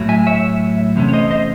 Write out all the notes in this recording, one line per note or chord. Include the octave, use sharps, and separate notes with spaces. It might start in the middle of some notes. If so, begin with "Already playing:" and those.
Already playing: A2 F#3 A3
E5 G#5
C#5 E5
E2 C3 A3 C#4
C#5
C5 D#5
C5 D#5